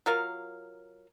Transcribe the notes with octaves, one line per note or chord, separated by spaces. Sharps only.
F#3 F4 A#4 F5